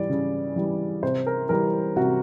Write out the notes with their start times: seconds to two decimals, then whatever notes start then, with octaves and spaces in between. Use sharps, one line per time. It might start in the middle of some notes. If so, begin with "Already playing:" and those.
Already playing: E3 G3 D5
0.09 C#3
0.56 E3 G3
1.03 C3 C5
1.27 A#4
1.49 E3 G3 A#4
1.96 C3 F#4